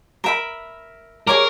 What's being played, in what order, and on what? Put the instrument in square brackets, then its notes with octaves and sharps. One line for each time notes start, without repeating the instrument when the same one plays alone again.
[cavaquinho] A#4 E5 B5
[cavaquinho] G#4 C#5 D6 [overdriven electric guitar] A#4